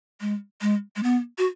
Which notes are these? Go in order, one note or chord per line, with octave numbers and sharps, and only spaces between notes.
G#3
G#3
G#3
B3
F#4